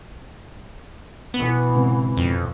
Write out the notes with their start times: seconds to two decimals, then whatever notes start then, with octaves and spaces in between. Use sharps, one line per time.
1.34 B2 E3 B3
1.75 G#2 C#3 C4
2.17 F2